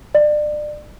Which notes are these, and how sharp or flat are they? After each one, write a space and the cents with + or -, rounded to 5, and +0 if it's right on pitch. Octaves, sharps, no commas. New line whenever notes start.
D5 +30